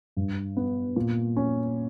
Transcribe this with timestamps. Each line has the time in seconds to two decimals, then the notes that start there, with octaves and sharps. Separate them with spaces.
0.17 G2
0.57 B3
0.96 A#2
1.37 C#4